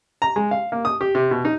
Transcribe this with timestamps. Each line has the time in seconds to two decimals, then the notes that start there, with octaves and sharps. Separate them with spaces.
0.22 A#5
0.36 G#3
0.51 F5
0.72 A#3
0.85 D#6
1.01 G4
1.15 C3
1.31 B2
1.45 D#4